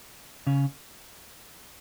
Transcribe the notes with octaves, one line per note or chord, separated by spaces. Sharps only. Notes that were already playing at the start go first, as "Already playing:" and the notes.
C#3 C#4